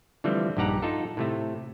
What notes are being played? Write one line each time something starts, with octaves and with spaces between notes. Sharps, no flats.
D3 E3 F3 G3 A3 C4
A#1 G2 D#4 G4 F#5 A#5
D#4 F4 A4
A2 C3 A3